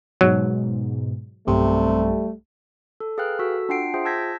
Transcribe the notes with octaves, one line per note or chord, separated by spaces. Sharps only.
G#2 B2 F#3
B1 G2 C3 G3 A3
A4
G#4 B4 F5 G5 F6 F#6
F#4 A4 E6 B6
D4 F4 F#5 G5 C7 D7
F4 G#4 C5 E5 G5
A5 E6 G6 G#6 A#6 B6